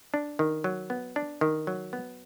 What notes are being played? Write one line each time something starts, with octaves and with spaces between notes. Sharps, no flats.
D4
D#3
F#3
B3
D4
D#3
F#3
B3